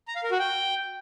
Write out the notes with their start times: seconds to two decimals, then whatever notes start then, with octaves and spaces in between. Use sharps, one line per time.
0.08 A#5
0.16 F5
0.23 A#4
0.31 F#4
0.39 G5